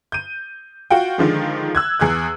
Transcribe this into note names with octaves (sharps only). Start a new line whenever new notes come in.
G6 D#7
F4 F#4 F#5 G5
D3 D#3 F3 G#3
E6 F#6 G#6
E2 G#4 F#6 G#6